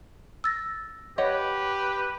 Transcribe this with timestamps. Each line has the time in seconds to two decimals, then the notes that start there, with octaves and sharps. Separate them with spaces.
0.44 E6 A6 A#6
1.18 G4 B4 C#5 D#5 F#5